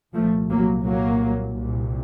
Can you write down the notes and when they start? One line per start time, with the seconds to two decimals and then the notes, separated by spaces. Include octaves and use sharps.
0.13 C2 A#2 F3 A3
0.49 F#3 A#3
0.85 F#3 A#3
1.57 C2 A#2